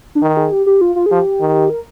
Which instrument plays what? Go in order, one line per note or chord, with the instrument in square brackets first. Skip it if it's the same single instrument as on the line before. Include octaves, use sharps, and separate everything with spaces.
[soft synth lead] D4
[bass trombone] D#3 [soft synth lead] D#4
[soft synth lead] G#4
G4
G4
F4
F4
G#4
[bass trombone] F3 [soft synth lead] G4
[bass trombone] D#3
[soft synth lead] A#4